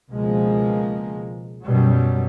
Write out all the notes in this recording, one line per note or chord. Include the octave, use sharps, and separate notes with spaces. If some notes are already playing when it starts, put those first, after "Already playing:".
C#2 B2 F3 G#3 A#3
F#2 B2 F#3 G3